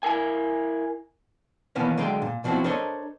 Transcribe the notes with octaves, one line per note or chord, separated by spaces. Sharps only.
E4 A#4 G#5
B2 D#3 E3 A#3 B3 C#4
D3 F#3 G#3 F5 G5
A#2
B2 F3 F#3 C4 E4 F#4
D4 A4 A#4 C5 C#5 D#5